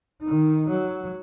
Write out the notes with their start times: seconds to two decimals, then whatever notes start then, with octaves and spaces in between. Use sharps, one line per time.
0.22 D#3 D#4
0.69 F#3